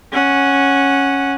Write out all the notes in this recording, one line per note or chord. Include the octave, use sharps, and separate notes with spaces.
C#4 F#5